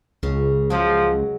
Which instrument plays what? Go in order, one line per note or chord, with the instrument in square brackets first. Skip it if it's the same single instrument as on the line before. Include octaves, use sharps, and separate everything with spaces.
[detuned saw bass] C#2 [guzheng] C#3
[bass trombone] F3 [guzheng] F#3 G#3